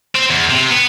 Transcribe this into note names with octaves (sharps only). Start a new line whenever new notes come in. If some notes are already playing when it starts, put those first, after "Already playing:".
C4
E2
C3
B3